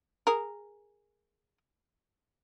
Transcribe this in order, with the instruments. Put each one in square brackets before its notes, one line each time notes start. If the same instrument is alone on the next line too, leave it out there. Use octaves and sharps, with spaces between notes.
[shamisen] G#4 A#4